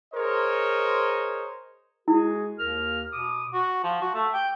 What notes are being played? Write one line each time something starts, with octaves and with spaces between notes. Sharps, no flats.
G#4 A#4 C5 C#5 D#5
G#3 E4 F#4 G#4
D#2 A#4 F6
B2 D6 D#6
F#4
F3
F#4
A3
G5